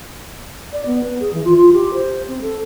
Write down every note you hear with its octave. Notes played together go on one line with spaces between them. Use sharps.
D5
B3
B4
G#4
E3
F4
F4
G4
C5
C4
A4